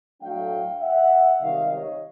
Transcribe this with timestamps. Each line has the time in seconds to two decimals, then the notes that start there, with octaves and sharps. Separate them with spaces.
0.21 A2 F#3 A3 D4 F5 G5
0.81 E5 F#5
1.41 C#2 C3 D#3 G3 C4 D#5 F5
1.71 C#5 D#5